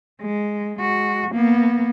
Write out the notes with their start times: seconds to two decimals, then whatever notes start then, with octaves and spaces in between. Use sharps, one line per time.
0.22 G#3
0.79 G#3 F#4
1.31 A#3 B3